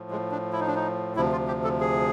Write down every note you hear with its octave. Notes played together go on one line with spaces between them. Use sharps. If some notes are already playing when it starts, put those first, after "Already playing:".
Already playing: A2 F3
G#3
D4
E4
D#4
D4
D#4
D2 C3 F3 E4
F4
G4
A4
G#4